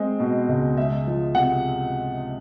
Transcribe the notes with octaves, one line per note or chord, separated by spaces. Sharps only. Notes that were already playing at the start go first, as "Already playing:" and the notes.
Already playing: G#3 C4
B2
C#2
G#3 E5
F3
C3 F#5